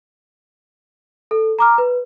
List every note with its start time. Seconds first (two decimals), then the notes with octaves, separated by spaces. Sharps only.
1.31 A4
1.59 A#5 D6 F6
1.78 B4